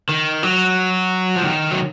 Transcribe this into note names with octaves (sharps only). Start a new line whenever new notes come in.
D#3
F#3
F3
D#3
F#3